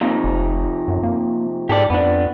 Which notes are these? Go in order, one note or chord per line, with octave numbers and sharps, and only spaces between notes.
F2 C3 A#3 D#4
F1
F#2
A#3
G#2 G4 A4 D5
F2 B3 D4